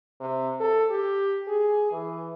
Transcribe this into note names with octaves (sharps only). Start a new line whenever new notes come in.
C3
A4
G4
G#4
E3